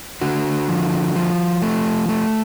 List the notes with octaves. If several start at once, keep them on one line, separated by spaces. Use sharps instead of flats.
D3 F#4
F3
F3
A3
A3